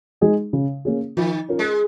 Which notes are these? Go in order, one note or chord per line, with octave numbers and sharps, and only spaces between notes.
G#3 D#4 G#4
C#3
A#3 C#4 G#4
D#3 F3
C#4 F4 A#4
G#3